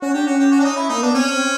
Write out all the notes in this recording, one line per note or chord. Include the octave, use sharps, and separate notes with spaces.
C#4 F#4
D4 G4
C#4 F#4
G4
F#4
D4
D#4
E4
A#3 D#4
B3 D4
C4 C#4